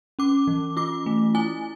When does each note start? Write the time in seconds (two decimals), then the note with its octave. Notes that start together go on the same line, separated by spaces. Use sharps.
0.19 C#4 D6
0.47 E3
0.77 F4 D6
1.06 A3
1.35 E4 G#5